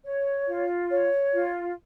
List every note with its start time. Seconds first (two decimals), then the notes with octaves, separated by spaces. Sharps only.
0.04 C#5
0.48 F4
0.91 C#5
1.33 F4